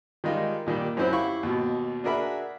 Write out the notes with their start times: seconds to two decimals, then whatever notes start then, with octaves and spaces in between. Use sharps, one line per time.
0.24 D#3 G3 G#3 D#4 F4
0.66 A#2 D#3 G3
0.97 F#2 C4 C#4 E4 C5 F#5
1.12 E4 G4 F5 B5 C#6
1.43 D#2 B2
2.04 D4 F#4 G#4 A#4 E5 B5